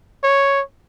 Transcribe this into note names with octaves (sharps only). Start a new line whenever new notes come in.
C#5